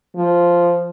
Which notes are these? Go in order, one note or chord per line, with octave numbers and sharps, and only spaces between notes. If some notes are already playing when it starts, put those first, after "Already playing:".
F3